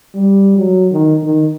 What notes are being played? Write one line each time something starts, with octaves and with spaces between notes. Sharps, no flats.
G3
F#3
D#3
D#3